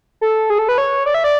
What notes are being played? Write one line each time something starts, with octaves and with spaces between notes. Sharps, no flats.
A4
G#4
A4
B4
C#5
D5
E5
D5